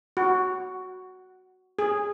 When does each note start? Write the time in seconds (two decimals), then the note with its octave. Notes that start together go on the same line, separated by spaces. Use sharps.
0.17 F#4
1.79 G#4